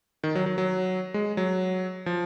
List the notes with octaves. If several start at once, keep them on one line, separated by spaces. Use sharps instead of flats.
D#3
F#3
F#3
F#3
G#3
F#3
F3